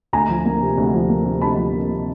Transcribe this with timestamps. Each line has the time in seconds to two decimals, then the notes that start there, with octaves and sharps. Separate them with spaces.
0.13 D2 G#5 A#5
0.29 F3
0.45 A#3
0.62 C3
0.78 D2
0.94 F3
1.09 A#3
1.26 C3
1.41 D2 A5 B5
1.58 F3
1.73 A#3
1.90 C3